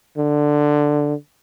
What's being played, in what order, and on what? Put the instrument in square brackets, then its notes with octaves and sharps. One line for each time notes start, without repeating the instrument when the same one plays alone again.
[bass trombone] D3